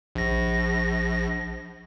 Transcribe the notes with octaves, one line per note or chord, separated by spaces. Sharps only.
A#1 A#6